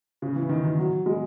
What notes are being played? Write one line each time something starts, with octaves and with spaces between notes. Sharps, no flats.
C#3
E3
D#3
D#3
F#3
G#3